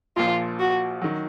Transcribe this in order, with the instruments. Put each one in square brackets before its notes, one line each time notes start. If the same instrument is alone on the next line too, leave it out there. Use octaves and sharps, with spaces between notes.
[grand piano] A#1 A#2 F3 [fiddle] F4
[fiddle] F#4
[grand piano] D#3 F#3